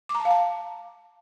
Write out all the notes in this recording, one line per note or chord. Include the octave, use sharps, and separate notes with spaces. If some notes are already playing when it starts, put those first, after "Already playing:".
D6
A#5
A5
F5
A5